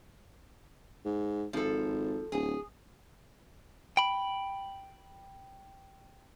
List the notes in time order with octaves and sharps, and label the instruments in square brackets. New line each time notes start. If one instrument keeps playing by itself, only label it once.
[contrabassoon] G#2
[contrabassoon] G#1 [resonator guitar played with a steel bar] F3 A4
[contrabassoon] D1 [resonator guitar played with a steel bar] G#4
[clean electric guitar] G5 B5